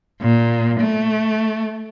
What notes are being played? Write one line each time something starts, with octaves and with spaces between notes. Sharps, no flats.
A#2
A3